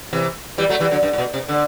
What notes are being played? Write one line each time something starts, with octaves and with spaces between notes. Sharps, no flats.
C3 E3
E3 G3
F#3 A3
E3 G3
D3 F#3
G2
A2
B2
C3
D3